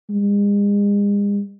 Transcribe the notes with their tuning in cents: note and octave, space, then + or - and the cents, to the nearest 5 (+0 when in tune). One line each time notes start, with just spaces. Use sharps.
G#3 -40